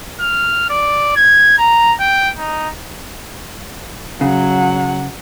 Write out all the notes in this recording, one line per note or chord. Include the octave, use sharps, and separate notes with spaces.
F6
D5
G#6
A#5
G5
D#4
C#3 F#3 F#5